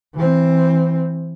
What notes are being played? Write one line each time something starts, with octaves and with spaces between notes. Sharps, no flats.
E3 C4